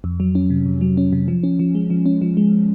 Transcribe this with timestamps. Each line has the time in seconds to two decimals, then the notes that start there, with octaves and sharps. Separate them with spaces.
0.04 F2
0.20 F#3
0.35 C#4
0.50 C3
0.66 F2
0.81 F#3
0.97 C#4
1.13 C3
1.28 F3
1.43 C#4
1.59 F3
1.75 G#3
1.90 F3
2.06 C#4
2.22 F3
2.37 G#3